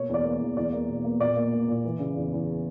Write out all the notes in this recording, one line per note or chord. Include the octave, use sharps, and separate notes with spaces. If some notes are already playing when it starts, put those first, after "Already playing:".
Already playing: B2 A#3 C#5
E2 D5
A#3
E2
E2 D5
A#3
B2
A#3
A#2 D5
A#3
A#3
A#2
E3
C#3
E2
E2